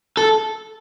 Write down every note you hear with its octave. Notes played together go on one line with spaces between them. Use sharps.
A4